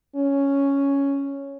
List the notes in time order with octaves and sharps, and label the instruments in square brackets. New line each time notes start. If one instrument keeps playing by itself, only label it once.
[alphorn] C#4